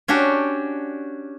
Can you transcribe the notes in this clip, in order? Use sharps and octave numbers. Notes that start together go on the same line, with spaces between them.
C#4 D4 F#4 G4